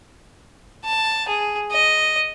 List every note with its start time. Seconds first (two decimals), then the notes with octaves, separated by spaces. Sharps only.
0.85 A5
1.28 G#4
1.72 D#5